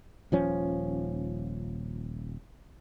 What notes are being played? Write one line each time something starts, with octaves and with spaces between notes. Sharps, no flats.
D#1 F3 C#4